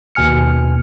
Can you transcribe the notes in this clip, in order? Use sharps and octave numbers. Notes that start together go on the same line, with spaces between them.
D#2 B2 G#5 F6 C#7